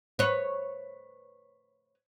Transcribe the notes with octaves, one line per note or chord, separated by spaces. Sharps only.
B4 C#5